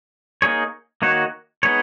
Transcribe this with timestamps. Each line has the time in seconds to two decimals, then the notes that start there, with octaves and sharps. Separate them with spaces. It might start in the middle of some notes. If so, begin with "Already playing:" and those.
0.42 A#3 D#4 G#4 C#5
1.02 D#3 A#3 D#4 F#4 C#5
1.63 G#3 B3 D#4 G#4 C#5